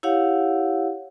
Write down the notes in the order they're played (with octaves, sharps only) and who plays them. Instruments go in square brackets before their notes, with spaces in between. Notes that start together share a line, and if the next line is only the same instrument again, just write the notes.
[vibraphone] E4 G4 C#5 F5 F#5